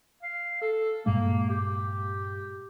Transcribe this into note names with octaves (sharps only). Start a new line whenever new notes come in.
F5
A4
G2 A#2 G#3 A#3
G4